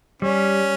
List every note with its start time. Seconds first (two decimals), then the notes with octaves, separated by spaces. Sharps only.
0.22 G3 C#4